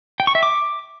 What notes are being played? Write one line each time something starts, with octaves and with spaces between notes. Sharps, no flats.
G5
C#6
E5
D6